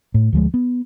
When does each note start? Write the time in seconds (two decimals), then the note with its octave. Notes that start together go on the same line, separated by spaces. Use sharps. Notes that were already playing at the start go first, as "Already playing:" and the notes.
0.14 A2
0.33 D2 F3 G#3
0.54 B3